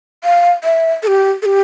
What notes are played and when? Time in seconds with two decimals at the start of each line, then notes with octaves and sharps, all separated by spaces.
0.24 F5
0.64 E5
1.03 A4
1.07 G4
1.42 A4
1.46 G4